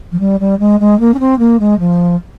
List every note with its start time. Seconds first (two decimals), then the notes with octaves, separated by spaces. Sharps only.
0.12 F3
0.20 G3
0.40 G3
0.59 G#3
0.80 G#3
1.00 A#3
1.14 C#4
1.19 C4
1.39 A#3
1.60 G#3
1.79 F3